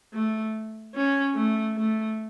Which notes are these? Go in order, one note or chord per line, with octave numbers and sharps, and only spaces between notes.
A3
C#4
A3
A3